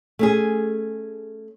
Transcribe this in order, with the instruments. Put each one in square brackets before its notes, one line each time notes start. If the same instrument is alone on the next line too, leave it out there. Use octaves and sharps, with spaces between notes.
[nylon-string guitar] A3 C#4 G#4